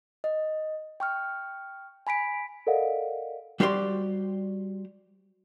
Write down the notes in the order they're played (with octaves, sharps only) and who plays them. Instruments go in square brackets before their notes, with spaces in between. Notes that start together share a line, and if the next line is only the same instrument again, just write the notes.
[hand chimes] D#5
G5 C#6 F6
G#5 B5 B6 D7
[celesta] A4 A#4 D5 D#5 F5 F#5
[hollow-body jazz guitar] G3 F#4 G4 C5 D5 C6